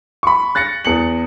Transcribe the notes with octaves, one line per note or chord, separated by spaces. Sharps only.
B5 C#6
F#6 A6 A#6 C#7
E2 C#7 F#7